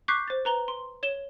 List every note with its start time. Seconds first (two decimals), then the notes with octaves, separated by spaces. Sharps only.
0.08 C#6 D6 F#6 G6 B6 C7
0.28 C5 A6
0.45 B4 A#5 G7
0.68 C6
1.03 C#5 E7 G7